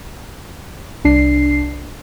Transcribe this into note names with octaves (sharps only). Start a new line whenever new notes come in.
C2 D4 C7